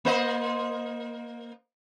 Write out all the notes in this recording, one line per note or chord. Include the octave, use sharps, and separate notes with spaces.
A#3 C5 D#5